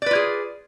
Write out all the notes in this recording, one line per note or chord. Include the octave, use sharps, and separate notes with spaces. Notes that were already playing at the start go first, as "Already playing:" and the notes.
F4 G#4 B4 D5